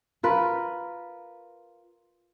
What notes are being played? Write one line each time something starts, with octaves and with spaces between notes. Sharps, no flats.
F4 A#4 B4